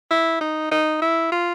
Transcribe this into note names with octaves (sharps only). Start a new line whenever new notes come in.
E4
D#4
D#4
E4
F4